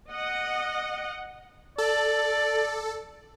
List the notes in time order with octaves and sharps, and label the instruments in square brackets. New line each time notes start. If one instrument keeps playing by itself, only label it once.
[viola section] D#5 F#5
[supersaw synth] A4 [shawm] D5